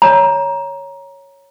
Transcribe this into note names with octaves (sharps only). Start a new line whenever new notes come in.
C#5 A#5